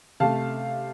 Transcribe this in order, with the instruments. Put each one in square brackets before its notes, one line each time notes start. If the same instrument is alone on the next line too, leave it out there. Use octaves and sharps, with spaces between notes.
[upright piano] C3 A3 F5 A5